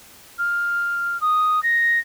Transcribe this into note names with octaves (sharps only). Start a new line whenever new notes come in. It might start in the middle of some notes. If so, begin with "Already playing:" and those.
F6
D#6
A#6